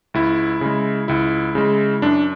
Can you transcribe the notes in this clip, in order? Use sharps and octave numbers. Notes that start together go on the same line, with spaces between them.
C#2 E4
C#3 G#3
C#2 E4
C#3 G#3
F#2 D4